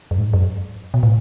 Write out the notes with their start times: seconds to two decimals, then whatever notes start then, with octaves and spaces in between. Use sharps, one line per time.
0.11 F#2
0.19 G#2
0.33 F#2
0.94 B2
1.03 A2